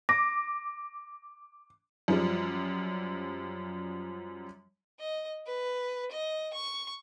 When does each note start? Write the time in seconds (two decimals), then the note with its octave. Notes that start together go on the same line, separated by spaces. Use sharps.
0.09 D6 A#6
2.08 F#2 F3 G3
4.99 D#5
5.47 B4
6.12 D#5
6.54 C#6